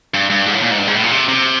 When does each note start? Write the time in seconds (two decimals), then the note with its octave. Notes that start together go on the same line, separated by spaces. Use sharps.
0.14 G2
0.30 G2
0.46 G#2
0.54 A2
0.62 A#2
0.71 G#2
0.78 G2
0.87 G#2
0.95 A2
1.03 A#2
1.12 C3
1.29 C3